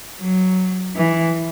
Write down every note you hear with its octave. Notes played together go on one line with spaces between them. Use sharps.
F#3
E3